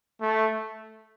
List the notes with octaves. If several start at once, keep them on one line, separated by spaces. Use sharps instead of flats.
A3